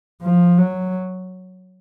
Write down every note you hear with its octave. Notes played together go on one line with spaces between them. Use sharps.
F3
F#3